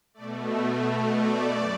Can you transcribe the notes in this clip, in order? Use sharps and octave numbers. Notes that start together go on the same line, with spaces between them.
B2 A3 D5
E5
D5
F#2